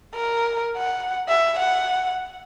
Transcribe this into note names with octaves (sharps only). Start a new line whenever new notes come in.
A#4
F#5
E5
F#5